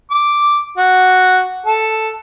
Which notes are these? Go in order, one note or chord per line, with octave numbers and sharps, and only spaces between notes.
D6
F#4
A4